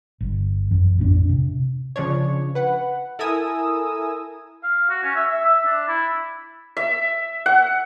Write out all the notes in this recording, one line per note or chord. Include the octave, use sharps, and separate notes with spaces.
G1
F#2 E3
A1 F2 C4 D4
C3
C#3 F3 D4 C#5
B4 F#5
E4 A4 A#4 G#5 D#6 E6
F5
F#4
C#4
E5
E5
E5
D4
E4
E5
F#5